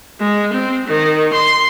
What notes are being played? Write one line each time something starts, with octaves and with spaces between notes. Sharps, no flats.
G#3
C4
D#3
C6